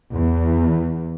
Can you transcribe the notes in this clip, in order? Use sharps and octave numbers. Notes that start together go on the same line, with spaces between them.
E2